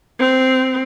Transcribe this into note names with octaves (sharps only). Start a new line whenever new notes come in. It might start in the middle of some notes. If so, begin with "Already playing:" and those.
C4